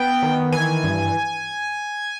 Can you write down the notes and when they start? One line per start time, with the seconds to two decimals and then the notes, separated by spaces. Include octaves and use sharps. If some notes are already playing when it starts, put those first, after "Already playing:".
Already playing: B3 G5
0.23 D#3
0.52 E3 G#5
0.83 G2